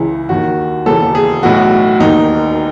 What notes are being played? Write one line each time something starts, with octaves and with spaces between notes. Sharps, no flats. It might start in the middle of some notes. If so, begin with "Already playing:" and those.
Already playing: C#2 C#3 E3 E4
D#2 D#3 F#4
E1 D#2 C#3 E3 A4
G#4
B1 A2 E3 F#4
E1 D#2 D#3 D#4